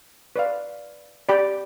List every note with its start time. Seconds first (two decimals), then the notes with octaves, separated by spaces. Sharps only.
0.36 B4 D5 F5
1.29 G4 D5 G5 B5